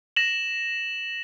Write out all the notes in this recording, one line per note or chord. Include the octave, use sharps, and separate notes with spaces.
A#6 E7 F#7